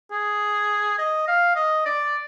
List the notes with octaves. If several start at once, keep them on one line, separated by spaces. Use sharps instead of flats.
G#4
D#5
F5
D#5
D5